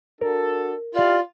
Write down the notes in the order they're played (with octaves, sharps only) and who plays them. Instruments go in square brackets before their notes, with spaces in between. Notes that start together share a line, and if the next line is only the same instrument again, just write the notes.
[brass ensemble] D4 F#4 A4 [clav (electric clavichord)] A#4
[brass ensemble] E4 G4 F5 [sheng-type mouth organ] F4 [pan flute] D5